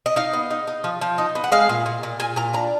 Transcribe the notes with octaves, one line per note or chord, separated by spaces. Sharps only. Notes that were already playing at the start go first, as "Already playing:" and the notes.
D#5
D#4 F5
B3
D#4
D#4
F3
F3
D#4
B3
F#5
G#3 F5
A#2
A#2
A#2
A#2 G#5
A#2 A#5
D4 A#5